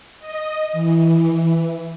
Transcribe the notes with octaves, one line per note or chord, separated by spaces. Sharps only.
D#5
E3